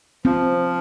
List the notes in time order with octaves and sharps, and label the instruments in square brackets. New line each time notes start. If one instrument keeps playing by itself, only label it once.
[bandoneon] F3 [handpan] C4